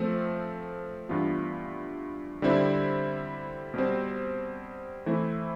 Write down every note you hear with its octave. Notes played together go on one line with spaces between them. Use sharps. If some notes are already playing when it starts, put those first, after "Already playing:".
Already playing: F3 A3 C4
G2 E3 B3 F4
D3 G3 C4 E4
B2 G3 C4
E3 A3 C4 E4